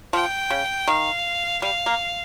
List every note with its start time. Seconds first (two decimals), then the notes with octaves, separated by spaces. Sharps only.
0.13 F3 G5
0.50 C#3
0.88 D#3 F5
1.62 G3 F5
1.86 A#3